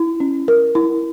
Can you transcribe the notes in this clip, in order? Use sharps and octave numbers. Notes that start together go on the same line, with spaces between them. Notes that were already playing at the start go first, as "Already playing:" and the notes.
Already playing: E4
C#4
A#4
E4